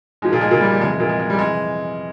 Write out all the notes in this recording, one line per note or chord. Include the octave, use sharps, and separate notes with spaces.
G#2 F3 G#3
A#2 A#3
G#3
A#2 A#3
G3
G3
F2 C3 E3 G#3
G#3
A#2 A#3
G#3
G#3
G3
F2 C3 E3 G#3